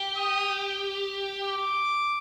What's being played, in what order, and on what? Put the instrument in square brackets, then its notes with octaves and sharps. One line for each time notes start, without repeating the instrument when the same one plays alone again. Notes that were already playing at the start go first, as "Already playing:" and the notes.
Already playing: [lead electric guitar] G4
[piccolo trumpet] D#6
D6